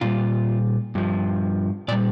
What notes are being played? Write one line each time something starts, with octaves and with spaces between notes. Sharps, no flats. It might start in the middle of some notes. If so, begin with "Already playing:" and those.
A#2 G3 F4
G2 F3
A#2 G3 D5